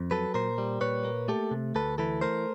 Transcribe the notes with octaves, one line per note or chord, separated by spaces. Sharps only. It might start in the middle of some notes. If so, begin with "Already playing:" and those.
Already playing: F2
F#3 A4 B4
A#2 A#4 C5
G3
A#2 B4 C#5
A#3
A3 G4 A4
C3
D2 A4 B4
E3 A4 B4
A3 A#4 C5